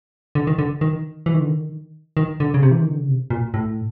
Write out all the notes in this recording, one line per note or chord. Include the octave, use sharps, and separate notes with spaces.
D3
D#3
D3
D#3
E3
D#3
D3
D#3
D#3
D3
C#3
C3
E3
D#3
D3
C#3
C3
A#2
A2